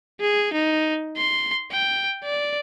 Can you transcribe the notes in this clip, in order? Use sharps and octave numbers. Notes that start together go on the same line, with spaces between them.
G#4
D#4
C6
G5
D5